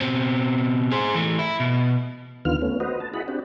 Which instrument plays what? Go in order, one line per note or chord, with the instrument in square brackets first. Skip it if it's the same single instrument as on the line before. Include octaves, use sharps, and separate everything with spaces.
[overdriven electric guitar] B2 C4
G#4 C5
E3 A3
E4
B2
[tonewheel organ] D#2 D3 D#3 B3 F4 F6
A3 B3 C#4
F#4 B4 C5 D#5
A5
E4 F#4 G#4 D#5 F#5 B5
C4 D4 F#4 G4